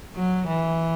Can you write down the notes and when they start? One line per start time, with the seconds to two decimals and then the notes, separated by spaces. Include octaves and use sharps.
0.15 F#3
0.47 E3